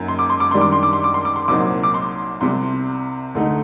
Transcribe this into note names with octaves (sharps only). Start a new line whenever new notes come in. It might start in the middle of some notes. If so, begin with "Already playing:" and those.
Already playing: F#2 F#3 A#3 D#4
C6
D6
C6
D6
F#2 D#3 G3 D4 C6
D6
C6
D6
C6
D6
C6
D6
C6
C2 A#2 F#3 C4 D#4 D6
D6
C6
C2 C3 G3 C6
D2 D3 A3 D#4